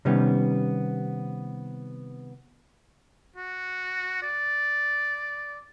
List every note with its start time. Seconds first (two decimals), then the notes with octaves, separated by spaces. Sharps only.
0.05 C3 D#3 G3 B3 C#4
3.36 F#4
4.22 D5